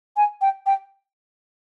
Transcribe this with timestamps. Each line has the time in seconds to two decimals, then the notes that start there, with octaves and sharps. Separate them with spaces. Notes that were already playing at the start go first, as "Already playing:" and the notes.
0.17 G#5
0.41 G5
0.66 G5